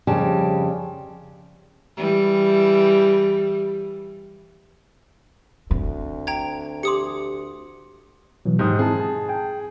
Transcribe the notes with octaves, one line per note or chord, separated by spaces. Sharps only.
F2 C#3 G3 G4 A5
E3 G3
D2 C4
G5 A#5 G#6
G4 C6 D6 D#6 C#7
B2 E3 F#3
G#2 D#3 G4 C5 D#6
C4 E4 G#4 A5
A5
G5 G#5